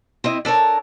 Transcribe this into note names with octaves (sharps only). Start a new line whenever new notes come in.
C4 E4 D#5
D4 A4 A#4 C#5